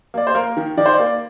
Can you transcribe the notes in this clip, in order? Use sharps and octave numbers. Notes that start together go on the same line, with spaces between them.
A#3 D5
C5
A#3 A#4
D#3
D#3 D5
C5
D5
A#3